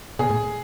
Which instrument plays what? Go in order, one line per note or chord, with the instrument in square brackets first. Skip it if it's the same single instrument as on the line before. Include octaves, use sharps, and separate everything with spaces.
[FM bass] B2 [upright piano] G#4
[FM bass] A2